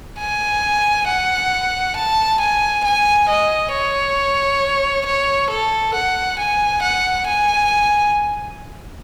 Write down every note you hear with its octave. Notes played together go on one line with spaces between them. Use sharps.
G#5
F#5
A5
G#5
G#5
D#5
C#5
C#5
A4
F#5
G#5
F#5
G#5